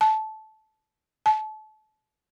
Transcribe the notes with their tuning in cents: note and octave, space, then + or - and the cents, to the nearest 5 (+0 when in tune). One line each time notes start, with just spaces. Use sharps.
A5 -15
A5 -30